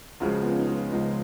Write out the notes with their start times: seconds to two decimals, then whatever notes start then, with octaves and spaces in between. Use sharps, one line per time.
0.20 C#2 C#3 F3 G#3 F#4
0.42 B3
0.51 C#4
0.60 D#4
0.68 F4
0.92 C#2 C#3 F3 G#3 G#4